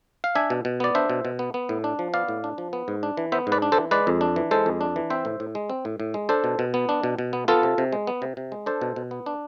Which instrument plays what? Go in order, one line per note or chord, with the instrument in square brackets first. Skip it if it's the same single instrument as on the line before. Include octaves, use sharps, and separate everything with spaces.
[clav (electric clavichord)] F5
D4 E5 G#5
B2
B2
B3 D5
D4 C5 E5
B2
B2
B3
B3
A2
D4
F3
B3 D5 F5
A2
D4
F3
B3
G#2
D4
E3
B3 C5 E5
G#2
B4 D5
D4
A4 C5
E3
G#3 B4 D5
F2
D4
E3
G#3 A4 C5
F2
D4
E3
C4 C5 E5
A2
A2
G#3
C4
A2
A2
G#3
D4 A4 C5
B2
B2
B3
D4
B2
B2
B3
B3 F4 A4
C3
C3
G#3
B3
C3
C3
G#3
D4 A4 C5
B2
B2
B3
D4